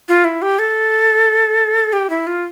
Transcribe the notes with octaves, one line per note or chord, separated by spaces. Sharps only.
F4
E4
G4
A4
G4
E4
F4